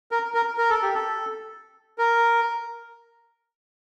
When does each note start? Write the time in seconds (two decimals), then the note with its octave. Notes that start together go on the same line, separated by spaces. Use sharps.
0.11 A#4
0.34 A#4
0.58 A#4
0.70 A4
0.82 G4
0.94 A4
1.98 A#4